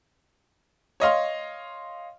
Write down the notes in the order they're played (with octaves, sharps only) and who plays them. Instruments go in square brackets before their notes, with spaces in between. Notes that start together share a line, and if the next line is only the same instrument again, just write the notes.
[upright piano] C#5 D#5 F5 C6